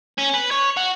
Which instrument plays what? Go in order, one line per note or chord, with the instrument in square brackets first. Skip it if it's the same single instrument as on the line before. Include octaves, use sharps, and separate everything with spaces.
[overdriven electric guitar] C#4
B4
C#5
F#4